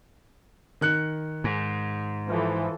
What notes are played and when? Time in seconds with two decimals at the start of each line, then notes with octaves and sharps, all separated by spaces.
0.81 D#3 F#6 C#7
1.44 G#2
2.29 E3 F3 A4